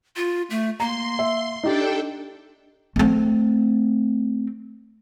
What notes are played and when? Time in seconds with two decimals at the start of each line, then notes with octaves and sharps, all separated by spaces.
0.16 F4
0.50 A3
0.80 A#3 A#5 C6
1.19 E5
1.63 D4 D#4 G4 A4 G5
2.96 A3 C4